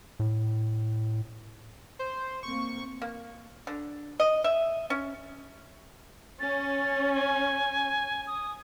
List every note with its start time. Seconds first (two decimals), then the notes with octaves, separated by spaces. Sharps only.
0.20 A2
1.99 C5
2.43 A#3 C4 C#6
3.02 A#3
3.67 D3
4.20 D#5
4.44 E5
4.90 C#4
6.40 C#4 A6
7.13 G#5
8.27 D#6